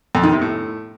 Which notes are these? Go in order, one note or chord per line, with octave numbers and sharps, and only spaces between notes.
F2
D#3
C3
A2